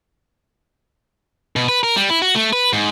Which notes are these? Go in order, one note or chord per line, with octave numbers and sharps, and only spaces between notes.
B2
B4
A#4
G3
E4
F#4
A3
B4
G#2